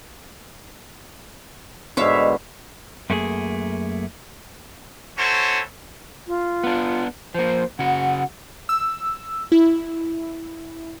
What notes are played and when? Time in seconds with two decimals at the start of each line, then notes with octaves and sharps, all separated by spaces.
1.97 G#2 B2 D3 C#5 E5 F5
3.10 F#2 A3 A#3 D4 G#4
5.17 C#4 E4 F#4 A4 C5 C#5
6.27 F4
6.64 B3 D4
7.34 F3 A#3 C5
7.79 C#3 F#4 F#5
8.69 E6
9.52 E4